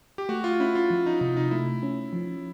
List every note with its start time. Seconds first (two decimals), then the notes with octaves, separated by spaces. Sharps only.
0.18 G4
0.29 A3 F#4
0.44 F4
0.60 C#4 E4
0.75 F4
0.90 F3
1.06 D#4
1.21 C3 D#4
1.37 D#4
1.51 A3 E4
1.83 C#4
2.13 F3